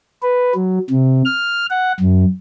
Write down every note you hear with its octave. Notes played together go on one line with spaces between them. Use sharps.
B4
F#3
C3
F6
F#5
F#2